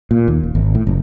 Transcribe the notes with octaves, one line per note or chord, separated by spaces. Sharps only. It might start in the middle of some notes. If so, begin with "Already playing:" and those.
A#2
D#2
D#1
G#1
A2
F#1